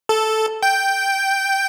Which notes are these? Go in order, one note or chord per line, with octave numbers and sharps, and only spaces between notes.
A4
G5